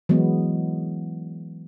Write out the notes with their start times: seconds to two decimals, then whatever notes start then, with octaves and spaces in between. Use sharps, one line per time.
0.09 E3 F#3 G#3 B3